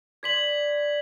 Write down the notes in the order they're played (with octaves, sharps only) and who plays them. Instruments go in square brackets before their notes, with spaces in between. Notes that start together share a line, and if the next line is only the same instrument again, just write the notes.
[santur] D5 C6 [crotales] G#6 B6 F#7